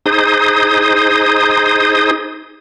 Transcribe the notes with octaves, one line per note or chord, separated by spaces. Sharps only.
D#4 G#4 C5 D#6